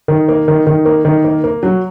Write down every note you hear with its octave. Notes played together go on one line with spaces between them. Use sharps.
D#3
A#3
D#3
D#3
A#3
D#3
A#3
A#3
F#3